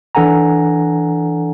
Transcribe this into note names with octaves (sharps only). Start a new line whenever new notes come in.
E3 D4 A4 F#5 G#5 A#5